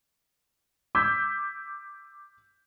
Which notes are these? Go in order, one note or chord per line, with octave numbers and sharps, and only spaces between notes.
D6 E6 G6 G#6 B6